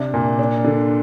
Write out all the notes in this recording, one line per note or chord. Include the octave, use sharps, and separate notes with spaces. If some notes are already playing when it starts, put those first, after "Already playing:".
Already playing: C3 D4
A#2
D4
D3